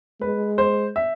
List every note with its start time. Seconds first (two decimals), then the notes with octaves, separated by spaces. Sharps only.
0.21 G#3 B4
0.58 C5
0.96 E5